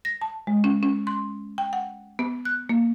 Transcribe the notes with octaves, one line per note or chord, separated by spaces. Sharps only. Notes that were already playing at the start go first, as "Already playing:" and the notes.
A#6
A5
G#3
C#4
C#4
C6
G5
F#5
B3
F#6
A#3